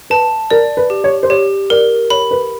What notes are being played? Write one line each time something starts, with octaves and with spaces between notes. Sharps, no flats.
B4 A5
A#4 D5
B4
G4
C#5
C5
G4 C#5
A#4 D5
C#5 B5
B4